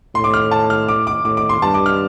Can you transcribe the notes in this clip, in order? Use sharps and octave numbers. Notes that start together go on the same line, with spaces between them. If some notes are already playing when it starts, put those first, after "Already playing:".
A2 C6
D6
F6
A5
F6
D6
D6
A2 D6
D6
C6
G2 A5
D6
F6